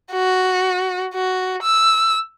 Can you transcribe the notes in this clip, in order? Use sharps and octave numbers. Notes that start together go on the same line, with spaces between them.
F#4
F#4
E6